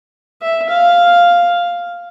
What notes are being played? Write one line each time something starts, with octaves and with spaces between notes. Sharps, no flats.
E5
F5